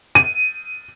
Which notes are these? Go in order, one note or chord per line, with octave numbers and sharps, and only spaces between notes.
D#7